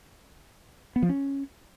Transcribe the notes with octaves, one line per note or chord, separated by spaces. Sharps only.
B3
F3
C#4